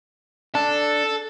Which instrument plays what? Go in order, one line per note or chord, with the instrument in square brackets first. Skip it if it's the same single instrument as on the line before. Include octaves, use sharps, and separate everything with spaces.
[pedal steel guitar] D4 [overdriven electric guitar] A4